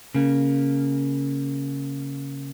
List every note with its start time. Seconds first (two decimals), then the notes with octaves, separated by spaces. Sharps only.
0.15 C#3 A#3